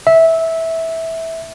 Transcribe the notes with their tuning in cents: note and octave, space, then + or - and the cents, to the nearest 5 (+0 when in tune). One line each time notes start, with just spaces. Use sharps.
E5 -15